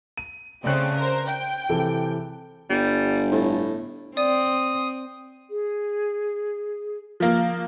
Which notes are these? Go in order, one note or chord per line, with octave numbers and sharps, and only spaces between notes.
D#7
C#3 A3 C4 D5 F#6
A#4 C5
G5
C3 E3 A4
G1 G3
A2
C4 D5 D#6
G#4
F3 A#3